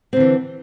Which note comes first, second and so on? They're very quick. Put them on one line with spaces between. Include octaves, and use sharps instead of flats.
C4 D3 E3